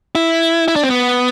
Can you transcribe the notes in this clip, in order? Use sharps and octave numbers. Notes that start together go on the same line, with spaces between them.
E4
E4
D4
C4
B3